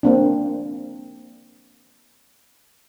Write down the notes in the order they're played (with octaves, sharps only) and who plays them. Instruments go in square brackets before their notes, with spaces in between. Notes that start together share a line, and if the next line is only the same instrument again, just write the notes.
[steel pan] A#3 C4 D4